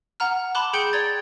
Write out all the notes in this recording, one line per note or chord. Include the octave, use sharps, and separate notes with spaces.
F#5 A#5 F6
A5 B5 C6 D6 F#6
G#4 G5 G6 C#7 D7 G7
D5 A#5 G#6 A6